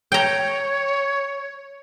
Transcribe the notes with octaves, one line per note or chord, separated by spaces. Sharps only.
C#5 G5 A#5